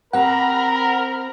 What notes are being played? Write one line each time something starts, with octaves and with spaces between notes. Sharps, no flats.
C4 G4 A#4 F#5 A#5 B5